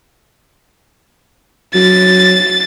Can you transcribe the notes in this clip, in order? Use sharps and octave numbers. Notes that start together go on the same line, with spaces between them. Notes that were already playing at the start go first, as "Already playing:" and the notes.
F#3 A6